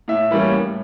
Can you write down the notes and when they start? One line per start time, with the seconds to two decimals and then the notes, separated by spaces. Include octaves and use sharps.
0.08 A2 E5
0.31 E3 G3 A#3 C#4
0.53 A2